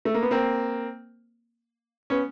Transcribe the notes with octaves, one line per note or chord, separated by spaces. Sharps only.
A3
A#3
B3
A#3 C4
B3 C#4